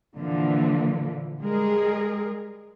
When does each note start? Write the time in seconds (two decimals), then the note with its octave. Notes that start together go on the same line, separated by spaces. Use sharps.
0.17 A#2 D3 E3 F3 A#3
1.40 G3 G#3 G#4 A#4